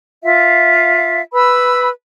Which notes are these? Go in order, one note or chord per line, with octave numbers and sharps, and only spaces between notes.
F4 E5 F5
B4 B5 E6